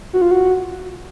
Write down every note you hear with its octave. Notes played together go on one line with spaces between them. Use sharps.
F#4
F4
F#4